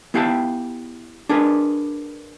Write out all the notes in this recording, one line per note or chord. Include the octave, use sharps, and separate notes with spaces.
B3 E4 G4 F5 G5 A5
D4 G#4 A#4 B4